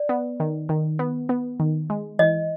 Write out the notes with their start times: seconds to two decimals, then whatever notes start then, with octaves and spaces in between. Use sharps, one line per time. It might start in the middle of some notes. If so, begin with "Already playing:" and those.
Already playing: D5
0.09 B3
0.40 D#3
0.69 D#3
0.99 B3
1.29 B3
1.60 D#3
1.90 G#3
2.19 E3 D#5